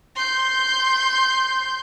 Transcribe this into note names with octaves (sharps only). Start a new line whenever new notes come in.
C6 G6